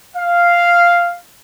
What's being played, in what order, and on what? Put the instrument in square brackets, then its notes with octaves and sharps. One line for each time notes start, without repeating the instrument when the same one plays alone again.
[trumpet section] F5